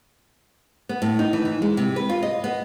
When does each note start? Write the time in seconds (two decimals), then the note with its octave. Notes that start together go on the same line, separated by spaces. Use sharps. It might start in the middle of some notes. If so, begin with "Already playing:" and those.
0.89 B3
1.02 A2
1.19 D#4
1.33 E3
1.45 E3
1.62 G#3
1.77 C3
1.96 B4
2.09 F4
2.23 D#5
2.44 B3